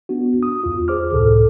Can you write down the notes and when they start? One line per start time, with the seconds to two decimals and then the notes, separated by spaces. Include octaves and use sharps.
0.09 B3 D4 F#4
0.43 D#6
0.64 E2 F4
0.88 G#4 C5 D6 F6
1.12 C#2 A2 C3 A4